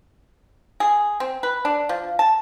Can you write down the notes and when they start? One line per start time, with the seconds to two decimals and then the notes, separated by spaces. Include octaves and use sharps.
0.80 G#4
1.20 C4
1.43 B4
1.65 D4
1.89 F3
2.19 A5